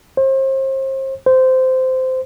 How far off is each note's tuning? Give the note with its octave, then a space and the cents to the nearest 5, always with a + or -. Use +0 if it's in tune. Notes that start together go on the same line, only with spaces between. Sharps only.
C5 +35
C5 -15